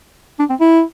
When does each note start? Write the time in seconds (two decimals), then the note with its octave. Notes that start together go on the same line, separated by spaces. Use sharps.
0.39 D4
0.50 C4
0.60 E4